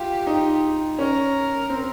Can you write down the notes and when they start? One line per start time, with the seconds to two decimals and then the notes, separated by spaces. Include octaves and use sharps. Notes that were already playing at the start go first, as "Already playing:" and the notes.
Already playing: F4 G4
0.27 D#4
0.99 C#4 A#4
1.70 C4